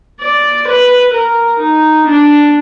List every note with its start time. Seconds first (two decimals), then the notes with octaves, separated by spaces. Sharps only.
0.21 D5
0.68 B4
1.14 A#4
1.59 D#4
2.06 D4